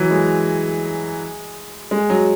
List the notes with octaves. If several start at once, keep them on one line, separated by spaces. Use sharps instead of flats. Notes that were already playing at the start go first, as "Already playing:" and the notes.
Already playing: E3 F#3
G#3
G#3
F#3